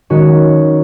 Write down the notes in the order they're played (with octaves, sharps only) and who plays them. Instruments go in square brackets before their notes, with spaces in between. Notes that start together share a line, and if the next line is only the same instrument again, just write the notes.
[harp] D#3 G#3 C#4 F#4